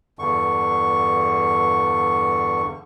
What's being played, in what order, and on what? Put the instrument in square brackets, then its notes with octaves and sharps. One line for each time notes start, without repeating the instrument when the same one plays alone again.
[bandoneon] E2 G2 D3 C#6